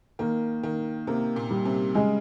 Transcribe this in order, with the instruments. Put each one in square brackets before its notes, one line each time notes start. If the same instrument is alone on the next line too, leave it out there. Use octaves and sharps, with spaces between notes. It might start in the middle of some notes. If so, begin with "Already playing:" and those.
[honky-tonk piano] D#3 [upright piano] A#3
[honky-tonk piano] D#3 [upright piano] A#3
[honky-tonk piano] C3 [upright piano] A#3
[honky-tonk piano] A#2
[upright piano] G3
[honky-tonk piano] C3
[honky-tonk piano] C#3 [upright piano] G#3